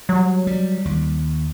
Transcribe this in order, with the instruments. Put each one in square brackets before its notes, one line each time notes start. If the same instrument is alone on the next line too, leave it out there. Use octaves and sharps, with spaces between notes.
[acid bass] F#3 [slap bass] G3
[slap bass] G3
D#2